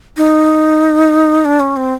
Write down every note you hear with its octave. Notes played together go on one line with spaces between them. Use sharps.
D#4
D4
C#4
C4